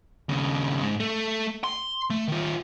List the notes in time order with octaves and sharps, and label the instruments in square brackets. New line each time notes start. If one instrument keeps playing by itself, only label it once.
[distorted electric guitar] D#2 C#3
G#2
A3
C6
A3
D#3 F4